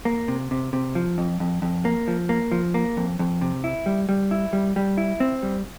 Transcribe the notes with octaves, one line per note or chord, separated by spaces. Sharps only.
A#3
C3
C3
C3
F3
F2
F2
F2
A#3
F3
A#3
F3
A#3
F2
F2
C3
E4
G3
G3
E4
G3
G3
E4
C4
G3